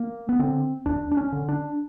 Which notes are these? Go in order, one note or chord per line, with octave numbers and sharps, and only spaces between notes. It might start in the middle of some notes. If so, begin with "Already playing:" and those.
Already playing: A#3
B3
D3 C4
D#2 D4
D4
C#4
D3
D4